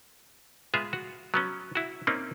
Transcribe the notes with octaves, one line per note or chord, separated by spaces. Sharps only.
G#3 B3 F4 G#4 E5
F#4
F#3 B3 C#4
E4 F#4
A#3 C4 C#4 D#4